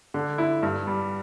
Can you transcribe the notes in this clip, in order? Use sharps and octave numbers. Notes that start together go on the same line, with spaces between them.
D3
E4
G2
G3